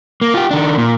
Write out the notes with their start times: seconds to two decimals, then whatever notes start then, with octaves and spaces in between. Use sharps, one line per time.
0.22 A#3
0.34 F4 G4
0.51 D#3 D4
0.78 A#2